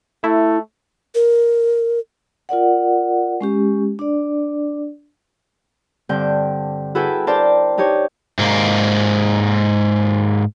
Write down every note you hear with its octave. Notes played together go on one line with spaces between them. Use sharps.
A3 E4
A#4
F4 A#4 D5 F#5
G#3 C#4 G4
D4 D5
G2 D3 C4 G5
E4 F#4 G#4 A4 B4 G5
D4 A#4 C5 D5 G5 A5
D4 D#4 G4 C#5
G#2 A#3